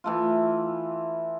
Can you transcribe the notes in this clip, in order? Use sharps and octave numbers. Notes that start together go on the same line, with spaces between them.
E3 A3 F4